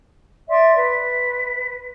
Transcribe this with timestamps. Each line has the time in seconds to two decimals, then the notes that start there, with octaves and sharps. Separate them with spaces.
0.49 D5 E5 C6
0.76 B4